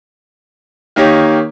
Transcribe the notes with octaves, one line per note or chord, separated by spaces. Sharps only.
D#3 A#3 D#4 G4 C#5